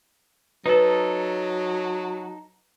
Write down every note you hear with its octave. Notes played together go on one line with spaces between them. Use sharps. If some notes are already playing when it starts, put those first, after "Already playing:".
F#3 D#4 A4 B4